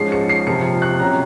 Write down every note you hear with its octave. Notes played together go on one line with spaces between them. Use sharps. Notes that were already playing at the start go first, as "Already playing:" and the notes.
Already playing: G#2 F3 G#3 C#4 C7
C#7
C7
C3 F3 A#3 C#7
F#6
C3 F#3 C#4 A#5